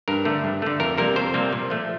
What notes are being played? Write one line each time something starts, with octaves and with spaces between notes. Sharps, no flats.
G2 A#4
D3 A3
G2
D3 A3
F2 A#4
C3 G3 A#3 A#4
F2 C5
C3 G3 A#3
A#2
F3 A3